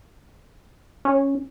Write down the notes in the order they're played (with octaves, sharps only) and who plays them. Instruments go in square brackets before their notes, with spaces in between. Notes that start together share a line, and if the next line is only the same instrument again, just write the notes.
[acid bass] C#4